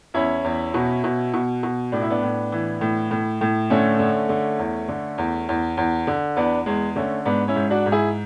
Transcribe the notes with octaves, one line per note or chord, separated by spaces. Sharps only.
E2 C#4 E4
E2
B2
B2
B2
B2
A2 D4
E4
B3 D4
A2
E3
A2
A2
A2
D3 A3 C#4
D3
D3
E2
D3
E2
E2
E2
D3
E2 B3 D4
E2 G#3
D3 A3 C#4
G#2 B3 D4
C#4 E4
G#2
D4 F#4
G#2
E4 G#4